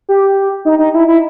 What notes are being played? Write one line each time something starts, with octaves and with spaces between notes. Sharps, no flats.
G4
D#4
D#4
E4
E4